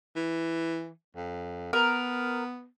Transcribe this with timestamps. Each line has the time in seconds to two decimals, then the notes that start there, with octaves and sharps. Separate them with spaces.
0.16 E3
1.16 F2
1.73 B3 A#4